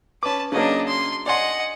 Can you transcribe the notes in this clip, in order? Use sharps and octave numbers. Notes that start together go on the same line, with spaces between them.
C#4 B4 A5 D6
C#3 F#3 A#3 D4 D#5
C6
D5 D#5 F#5 G#5 C6